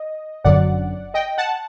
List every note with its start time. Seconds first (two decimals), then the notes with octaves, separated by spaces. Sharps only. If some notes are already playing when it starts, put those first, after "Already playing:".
Already playing: D#5
0.44 G1 F#2 D3 F#3 D5 F#5
1.14 D#5 G5
1.38 F#5 A5